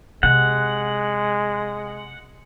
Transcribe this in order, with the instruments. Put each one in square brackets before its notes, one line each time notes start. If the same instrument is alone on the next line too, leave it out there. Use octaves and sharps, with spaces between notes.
[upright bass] C3 [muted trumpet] G#3 [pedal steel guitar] F#5